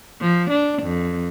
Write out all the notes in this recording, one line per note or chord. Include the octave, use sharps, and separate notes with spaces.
F3
D4
F2